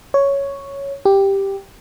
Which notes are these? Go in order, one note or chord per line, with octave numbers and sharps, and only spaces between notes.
C#5
G4